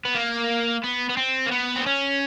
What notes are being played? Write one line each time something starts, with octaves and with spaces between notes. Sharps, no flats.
B3
A#3
B3
B3
C4
A#3
B3
C4
C#4